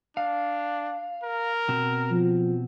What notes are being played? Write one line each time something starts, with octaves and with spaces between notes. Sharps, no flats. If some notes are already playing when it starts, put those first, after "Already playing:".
D4 F5
A#4
B2 C4
F3